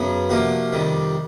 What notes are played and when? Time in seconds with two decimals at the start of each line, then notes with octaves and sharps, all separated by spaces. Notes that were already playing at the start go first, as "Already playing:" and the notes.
Already playing: F#2 C#3 F#3 B3
0.29 C3 F3 A#3 D4 F#4
0.72 F2 C3 D#3 G3